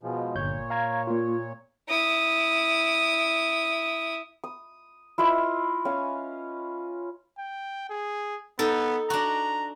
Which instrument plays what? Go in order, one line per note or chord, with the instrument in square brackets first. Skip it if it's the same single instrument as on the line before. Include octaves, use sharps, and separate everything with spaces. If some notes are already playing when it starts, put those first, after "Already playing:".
[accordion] B2 F3 G#3
[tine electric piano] G1 G6 [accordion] A#2 C#5
[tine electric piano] F5 A#5 G#6
A#3 F4
[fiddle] E4 D#6
[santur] D#6
E4 F4 B4 D#5
C#4 F5 G#5
[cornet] G5
G#4
[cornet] B3 [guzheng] D#4 A4
[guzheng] D4 F#4 [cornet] A#5